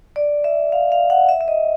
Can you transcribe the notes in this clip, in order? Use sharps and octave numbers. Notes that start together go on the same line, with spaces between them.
D5
E5
F5
F5
F#5
E5
E5
D#5